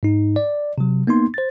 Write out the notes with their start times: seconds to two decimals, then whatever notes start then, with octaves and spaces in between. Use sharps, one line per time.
0.03 G#2 D#4
0.36 D5
0.78 C3 F#3
1.07 A#3 B3 D#4 C6
1.34 C5 A6